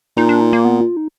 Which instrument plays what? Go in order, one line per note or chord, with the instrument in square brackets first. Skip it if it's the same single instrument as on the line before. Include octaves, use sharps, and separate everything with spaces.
[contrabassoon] A#2 [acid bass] D#4
[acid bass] D4
D#4
A#3
B3
F4
D#4